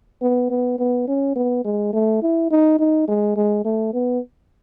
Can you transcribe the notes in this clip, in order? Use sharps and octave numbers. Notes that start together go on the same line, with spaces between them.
B3
B3
B3
C#4
B3
G#3
A3
E4
D#4
D#4
G#3
G#3
A3
B3